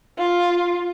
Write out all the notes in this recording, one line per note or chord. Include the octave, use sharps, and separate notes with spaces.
F4